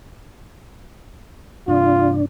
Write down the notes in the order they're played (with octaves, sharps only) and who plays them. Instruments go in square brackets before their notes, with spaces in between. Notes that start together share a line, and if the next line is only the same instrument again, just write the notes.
[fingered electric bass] G2 C3 [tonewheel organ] D4 [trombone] F4